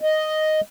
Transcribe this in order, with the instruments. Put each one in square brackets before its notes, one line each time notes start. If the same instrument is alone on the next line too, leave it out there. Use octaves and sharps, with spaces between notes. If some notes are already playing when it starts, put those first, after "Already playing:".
[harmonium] D#5